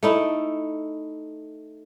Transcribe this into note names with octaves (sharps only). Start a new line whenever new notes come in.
A3 D#4 E4